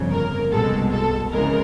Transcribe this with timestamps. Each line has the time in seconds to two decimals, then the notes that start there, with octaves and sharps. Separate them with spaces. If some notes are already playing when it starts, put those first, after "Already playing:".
Already playing: G1 F2 C#3
0.11 A#4
0.51 C2 B2 G#3 A4
0.92 A4
1.31 F2 C#3 E3 G#3 A#4